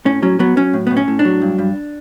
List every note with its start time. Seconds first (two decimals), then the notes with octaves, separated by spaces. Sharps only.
0.05 A2 C#4
0.22 F#3 C#4
0.39 F#3 B3
0.57 F#3 C#4
0.73 A2
0.87 A2 B3
0.97 C#4
1.08 A2
1.19 D4
1.25 F#3
1.42 G2
1.58 G2